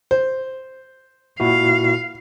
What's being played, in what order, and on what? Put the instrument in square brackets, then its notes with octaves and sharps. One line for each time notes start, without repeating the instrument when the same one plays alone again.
[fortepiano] C5
[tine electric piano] A#2 E4 F#4 [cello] F5